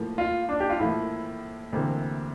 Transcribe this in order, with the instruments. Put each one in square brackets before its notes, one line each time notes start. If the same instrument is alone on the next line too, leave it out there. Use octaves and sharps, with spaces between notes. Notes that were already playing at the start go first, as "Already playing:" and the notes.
Already playing: [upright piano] A2 F3 A#3
[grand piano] F4
D4
G4
F4
[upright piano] A2 F3 A#3 [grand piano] E4
[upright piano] D2 C3 E3 A#3